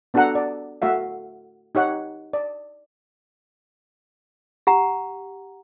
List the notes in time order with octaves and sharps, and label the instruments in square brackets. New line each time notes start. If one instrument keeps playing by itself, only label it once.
[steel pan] B3 D4 F#4 A4 F#5 A#5
D5
A3 F#4 E5 F5
D#4 G4 C#5 F#5
D5
[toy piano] G4 F#5 A#5